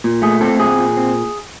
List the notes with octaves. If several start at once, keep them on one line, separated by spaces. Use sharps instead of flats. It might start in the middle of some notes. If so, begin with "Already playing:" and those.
A#2
A3 G#4
C4 A4
A#2 G#4
A#2
C4